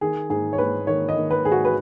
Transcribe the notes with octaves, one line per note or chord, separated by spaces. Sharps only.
D#3 G#4
G#2 G#4
C#5
G#2 B4
D#3 C#5
D#5
D#3
B4
G#2 G#4
F#4
B4